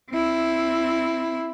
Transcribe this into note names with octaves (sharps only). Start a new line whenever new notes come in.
C4 E4